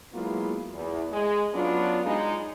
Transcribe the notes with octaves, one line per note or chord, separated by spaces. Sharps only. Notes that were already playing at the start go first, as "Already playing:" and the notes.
F#3 G#3 A#3 B3 E4 F4
E2
G#3
F#3 B3 C#4 D4 F4
G#3 D#4